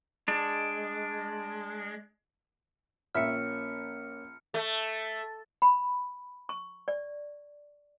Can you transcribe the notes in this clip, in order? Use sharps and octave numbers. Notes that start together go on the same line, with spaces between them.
G#3 D4
A#1 A#3 C#4 E5 F6 C#7
A3
B5
C#6
D5